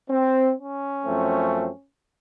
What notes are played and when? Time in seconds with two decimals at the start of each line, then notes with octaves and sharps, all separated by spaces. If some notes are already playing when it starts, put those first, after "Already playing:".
0.10 C4
0.58 C#4
1.05 F#2 F3 A3 C4